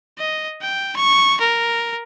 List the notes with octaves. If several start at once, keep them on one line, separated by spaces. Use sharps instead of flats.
D#5
G5
C#6
A#4